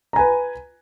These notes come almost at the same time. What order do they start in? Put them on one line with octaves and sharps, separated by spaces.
A#5 G#5 B4